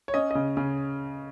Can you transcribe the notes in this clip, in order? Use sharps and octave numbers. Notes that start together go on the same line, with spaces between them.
C#5
C#4 D#5
C#3 D#5
C#3